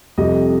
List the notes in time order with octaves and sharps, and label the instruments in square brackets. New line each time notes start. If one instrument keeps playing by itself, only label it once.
[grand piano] F1 F2 C3 G3 D#5